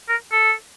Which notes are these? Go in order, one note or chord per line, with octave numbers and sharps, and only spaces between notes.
A#4
A4